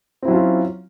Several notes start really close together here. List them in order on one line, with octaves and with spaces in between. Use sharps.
C4 E4 F#3 C#4 F4